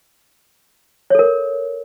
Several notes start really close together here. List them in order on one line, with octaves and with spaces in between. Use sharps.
C#5 A4 A#4